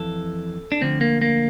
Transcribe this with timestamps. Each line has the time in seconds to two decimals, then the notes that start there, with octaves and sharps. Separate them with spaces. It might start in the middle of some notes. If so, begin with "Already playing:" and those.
Already playing: F2 E3 A4
0.72 D4
0.81 D2 D3 F3 C4
1.01 A#3
1.22 A#3